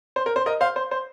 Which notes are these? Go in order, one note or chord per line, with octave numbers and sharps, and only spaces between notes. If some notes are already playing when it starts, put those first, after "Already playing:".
C5
A#4
C5
A#4 D#5
C5 F5
C5
C5